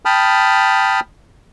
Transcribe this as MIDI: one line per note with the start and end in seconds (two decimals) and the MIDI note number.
0.05 1.00 79
0.05 1.00 81
0.05 1.00 83
0.05 1.00 87
0.05 1.00 89